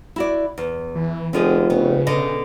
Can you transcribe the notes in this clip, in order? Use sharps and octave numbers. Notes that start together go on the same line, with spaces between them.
E4 F#4 D5
E2
E3
F1 D3 F3 C4 G#4
C#3 B3
B2 D3 D#5